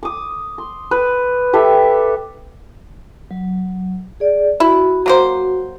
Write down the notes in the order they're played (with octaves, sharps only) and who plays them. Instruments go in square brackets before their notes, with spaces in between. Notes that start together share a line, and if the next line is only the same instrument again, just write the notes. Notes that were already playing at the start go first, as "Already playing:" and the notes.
[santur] D6 D#6
C6
B4
G4 A4 E5
[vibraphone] F#3
G#4 D5
[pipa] E4 [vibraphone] F#4
[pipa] F#3 A#3 C5